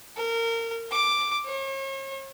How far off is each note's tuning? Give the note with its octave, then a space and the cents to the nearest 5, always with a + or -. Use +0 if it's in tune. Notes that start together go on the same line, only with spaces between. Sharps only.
A#4 -25
D6 +5
C#5 -40